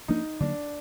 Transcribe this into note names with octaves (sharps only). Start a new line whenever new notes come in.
F3 A#3 D4 D#4
D3 F#3 A#3 D4